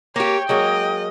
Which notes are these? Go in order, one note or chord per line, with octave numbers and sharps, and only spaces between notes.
A#3 G4 C#5 G5
F#3 G#3 A#3 D#5